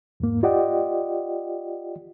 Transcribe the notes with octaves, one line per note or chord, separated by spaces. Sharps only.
E2 G#2 A#3
F4 G4 D5 D#5 F#5 G5